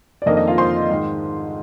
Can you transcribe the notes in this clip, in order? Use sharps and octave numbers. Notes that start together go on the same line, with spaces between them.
D5
F2 D#3 A#3 D4 D#5
D#5
F4 F5
C5 C6
G#2 D#3 G#3